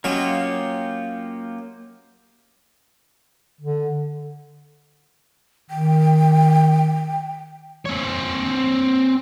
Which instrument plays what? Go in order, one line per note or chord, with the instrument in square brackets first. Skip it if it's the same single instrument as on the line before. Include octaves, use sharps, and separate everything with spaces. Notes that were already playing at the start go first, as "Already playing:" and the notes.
[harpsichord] F#3 C#4 D#5 [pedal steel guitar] A#3 F4 G4
[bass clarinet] D3
[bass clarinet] D#3 [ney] G5
[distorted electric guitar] C4 C#5